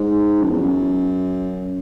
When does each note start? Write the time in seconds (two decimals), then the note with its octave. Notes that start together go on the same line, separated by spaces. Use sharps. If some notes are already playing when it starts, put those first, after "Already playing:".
Already playing: G#2
0.41 F#2
0.51 E2
0.60 F#2